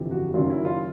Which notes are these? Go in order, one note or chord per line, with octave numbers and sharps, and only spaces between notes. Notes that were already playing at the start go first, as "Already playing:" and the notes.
Already playing: G1 F2 C3 E3
F#4
F#1 F#2 D#3 F#3 F4
E4
F4